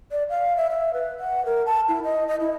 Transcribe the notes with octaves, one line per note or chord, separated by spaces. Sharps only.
D5
F5
E5
E5
B4
F#5
A#4
A5
E4
D#5
D#5
E4